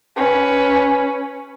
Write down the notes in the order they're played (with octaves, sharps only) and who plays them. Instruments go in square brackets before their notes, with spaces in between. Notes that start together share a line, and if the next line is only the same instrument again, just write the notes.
[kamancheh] C#4 B4